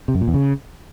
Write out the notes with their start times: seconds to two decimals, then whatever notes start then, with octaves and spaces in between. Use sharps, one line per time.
0.08 C3
0.15 F#2
0.21 A#2
0.28 E2
0.34 C#3